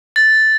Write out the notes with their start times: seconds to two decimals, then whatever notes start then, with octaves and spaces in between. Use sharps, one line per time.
0.16 A6